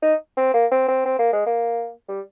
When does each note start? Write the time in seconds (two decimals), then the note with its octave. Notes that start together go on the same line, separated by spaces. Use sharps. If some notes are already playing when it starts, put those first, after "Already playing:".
0.02 D#4
0.37 C4
0.54 A#3
0.71 C4
0.88 C4
1.05 C4
1.19 A#3
1.33 G#3
1.46 A#3
2.08 G3